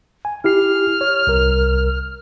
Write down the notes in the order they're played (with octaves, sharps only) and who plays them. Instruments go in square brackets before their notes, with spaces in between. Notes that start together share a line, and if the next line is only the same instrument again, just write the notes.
[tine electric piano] G#5
[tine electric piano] E4 G4 C7 [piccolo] F6
[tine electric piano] C#5
C2 A#4